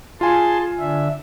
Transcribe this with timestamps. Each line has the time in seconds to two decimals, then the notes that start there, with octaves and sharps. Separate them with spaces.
0.21 F4 G#4 G#5 A5 C6
0.79 D3 D4 E5